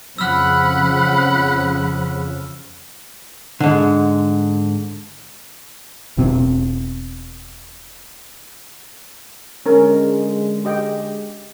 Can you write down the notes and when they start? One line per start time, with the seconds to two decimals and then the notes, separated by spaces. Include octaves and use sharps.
0.18 F2 C#3 F3 F#5 B5 E6 F6
3.60 G#2 D3
6.17 E1 B2 C4
9.66 D3 G#3 C#4 A#4
10.65 G4 D#5 G5